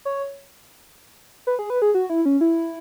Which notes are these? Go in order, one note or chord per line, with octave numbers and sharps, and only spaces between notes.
C#5
B4
G#4
B4
G#4
F#4
E4
C#4
E4